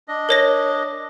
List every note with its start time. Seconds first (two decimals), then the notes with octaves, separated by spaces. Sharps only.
0.08 D4 D#5
0.29 A#4 C#5 A#6